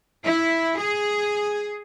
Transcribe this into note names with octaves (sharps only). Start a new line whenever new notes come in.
E4
G#4